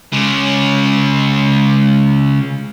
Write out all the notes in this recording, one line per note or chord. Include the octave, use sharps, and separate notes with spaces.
C#3 G#3